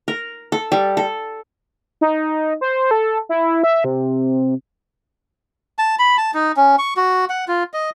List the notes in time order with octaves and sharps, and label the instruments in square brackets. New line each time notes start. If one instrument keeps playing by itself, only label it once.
[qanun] A#4
A4
G3
A4
[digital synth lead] D#4
C5
A4
E4
E5
C3
[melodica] A5
B5
A5
D#4
C#4
C#6
F#4
F#5
F4
D#5